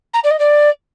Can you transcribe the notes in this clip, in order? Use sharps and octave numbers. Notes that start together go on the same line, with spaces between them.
A#5
D5
D#5
D5